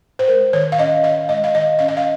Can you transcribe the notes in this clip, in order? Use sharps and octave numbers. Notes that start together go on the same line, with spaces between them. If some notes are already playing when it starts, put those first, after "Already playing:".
C5
G#3 A#4
D#3 C#5
F5
C#4 D#5
D#3 F5
G#3 D#5
F5
D#3 D#5
C#4 F5
D#5
F5